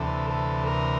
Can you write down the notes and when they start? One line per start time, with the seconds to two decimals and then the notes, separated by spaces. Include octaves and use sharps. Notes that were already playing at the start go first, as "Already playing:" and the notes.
Already playing: D2 C3 E3 A4
0.30 A4
0.67 A#4